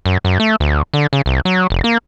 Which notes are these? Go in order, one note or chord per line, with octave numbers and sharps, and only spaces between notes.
F#2
F#2
A3
D2
D3
C#3
C2
F#3
F1
A#3